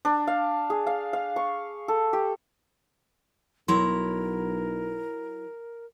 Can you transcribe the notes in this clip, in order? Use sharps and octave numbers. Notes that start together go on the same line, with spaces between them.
D4
F5
G#4
F5
F5
C#6
A4
G4
B1 F#3 E4 A#4 A#5 C6